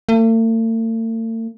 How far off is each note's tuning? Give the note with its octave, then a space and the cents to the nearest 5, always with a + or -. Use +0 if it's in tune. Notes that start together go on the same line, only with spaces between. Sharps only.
A3 +45